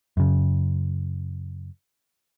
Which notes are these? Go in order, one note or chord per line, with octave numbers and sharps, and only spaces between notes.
F#2 C#3